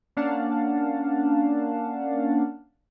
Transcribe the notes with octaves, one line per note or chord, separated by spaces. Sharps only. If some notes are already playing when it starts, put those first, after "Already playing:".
A#3 C#4 D4 F5 F#5 A5